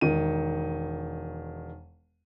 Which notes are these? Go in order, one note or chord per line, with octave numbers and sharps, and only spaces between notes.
E1 D#3 D#7